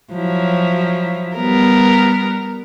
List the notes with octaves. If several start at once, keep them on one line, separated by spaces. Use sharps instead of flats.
F3 F#3 E4
G3 B3 A#4